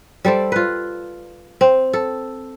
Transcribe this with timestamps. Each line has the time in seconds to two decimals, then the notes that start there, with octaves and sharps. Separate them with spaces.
0.25 G3 A4 C5 D5
0.52 F4 B4
1.61 C4
1.93 A4